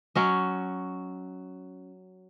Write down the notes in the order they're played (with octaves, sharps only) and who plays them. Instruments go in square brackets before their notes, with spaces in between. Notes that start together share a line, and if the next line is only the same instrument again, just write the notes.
[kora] F#3 C#4 D#5